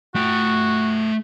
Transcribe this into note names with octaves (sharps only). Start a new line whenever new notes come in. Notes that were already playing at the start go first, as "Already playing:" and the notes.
A3 F#4 G5